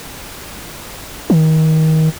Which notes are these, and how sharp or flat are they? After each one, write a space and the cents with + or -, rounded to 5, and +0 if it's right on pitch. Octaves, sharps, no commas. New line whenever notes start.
D#3 +25